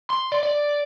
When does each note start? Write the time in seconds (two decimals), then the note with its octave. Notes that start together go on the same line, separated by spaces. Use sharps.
0.10 C6
0.32 D5
0.43 D5